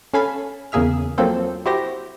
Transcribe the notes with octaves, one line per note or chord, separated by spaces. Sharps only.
C#4 A4 F5 G#5 B5
E2 C#3 A#3 G#4 E5 F6
F3 F#3 A#3 C4 A4 C5
E4 F#4 G4 C5 A#6